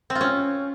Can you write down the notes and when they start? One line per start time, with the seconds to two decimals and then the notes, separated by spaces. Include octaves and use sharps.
0.10 C4
0.15 F4
0.21 C#4